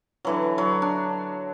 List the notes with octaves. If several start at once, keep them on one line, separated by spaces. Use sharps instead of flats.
D3 E3 F#3
F#3
D4